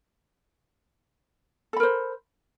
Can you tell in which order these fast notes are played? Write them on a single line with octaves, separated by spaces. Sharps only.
A4 B5 A#4 C5